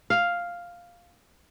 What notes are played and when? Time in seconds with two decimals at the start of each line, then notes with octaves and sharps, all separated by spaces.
0.10 F5